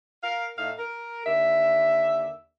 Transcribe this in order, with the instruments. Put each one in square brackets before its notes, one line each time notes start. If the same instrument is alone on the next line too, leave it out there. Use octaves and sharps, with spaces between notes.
[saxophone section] A#4 F5
A2 D#4 E5 F5
A#4
D#2 D3 E5